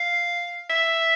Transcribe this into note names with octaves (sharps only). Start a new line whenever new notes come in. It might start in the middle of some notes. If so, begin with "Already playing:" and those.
Already playing: F5
E5